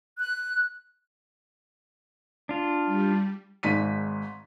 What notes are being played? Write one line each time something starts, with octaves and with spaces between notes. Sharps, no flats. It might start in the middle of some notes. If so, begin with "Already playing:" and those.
F#6
D4 F4
G3
G#1 G#2 B6 D#7